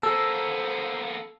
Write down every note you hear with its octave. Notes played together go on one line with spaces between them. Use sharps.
A#3 B3 A4 C5 E6